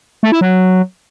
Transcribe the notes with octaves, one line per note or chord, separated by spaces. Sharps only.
A3
E4
F#3